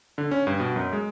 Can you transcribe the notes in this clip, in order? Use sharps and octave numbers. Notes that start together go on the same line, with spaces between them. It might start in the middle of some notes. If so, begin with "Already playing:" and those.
D3
C#4
G2
B2
F#2
G#3